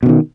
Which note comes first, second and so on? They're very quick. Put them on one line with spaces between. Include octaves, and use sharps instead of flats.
B2 D3 D#3